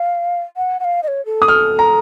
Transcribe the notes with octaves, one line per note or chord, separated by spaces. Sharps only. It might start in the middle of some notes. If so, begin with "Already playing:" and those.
Already playing: F5
F#5
F#5
F5
D#5
C#5
A4
D#6
F6
A#5